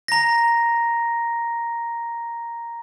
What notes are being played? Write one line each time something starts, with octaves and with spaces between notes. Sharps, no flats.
A#5 A#6